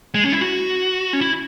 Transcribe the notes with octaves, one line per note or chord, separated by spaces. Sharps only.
G#3
C#4
E4
F#4
C#4
E4